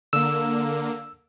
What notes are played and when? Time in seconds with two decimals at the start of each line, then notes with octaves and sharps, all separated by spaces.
0.13 D3 A#3 E6